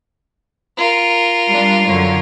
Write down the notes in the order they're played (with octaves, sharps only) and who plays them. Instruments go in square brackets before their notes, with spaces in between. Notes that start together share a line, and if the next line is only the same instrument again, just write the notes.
[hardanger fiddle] F4 A#4
[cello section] G3 D4
F#2 D3 C#5